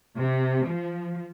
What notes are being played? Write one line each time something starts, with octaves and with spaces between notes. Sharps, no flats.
C3
F3